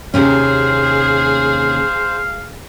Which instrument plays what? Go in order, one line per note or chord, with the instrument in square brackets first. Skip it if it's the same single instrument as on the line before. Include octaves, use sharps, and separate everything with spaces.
[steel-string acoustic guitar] D#2 C3 C#4 [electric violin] G#4 [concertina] C5 [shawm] F5